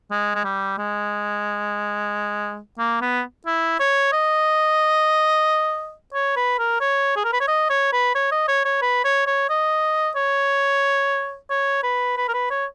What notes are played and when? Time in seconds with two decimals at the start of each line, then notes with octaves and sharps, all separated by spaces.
0.11 G#3
0.35 G#3
0.44 G3
0.78 G#3
2.78 A#3
3.01 B3
3.46 E4
3.79 C#5
4.13 D#5
6.14 C#5
6.36 B4
6.59 A#4
6.80 C#5
7.16 G#4
7.24 A#4
7.32 B4
7.40 C#5
7.48 D#5
7.70 C#5
7.93 B4
8.15 C#5
8.31 D#5
8.48 C#5
8.65 C#5
8.82 B4
9.04 C#5
9.27 C#5
9.49 D#5
10.16 C#5
11.50 C#5
11.83 B4
12.17 B4
12.28 A#4
12.34 B4
12.50 C#5